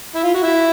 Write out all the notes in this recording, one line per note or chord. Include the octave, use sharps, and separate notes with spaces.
E4
F4
F#4
E4